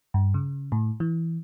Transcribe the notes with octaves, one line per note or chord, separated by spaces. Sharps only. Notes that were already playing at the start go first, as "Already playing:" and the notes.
G2
C#3
A2
E3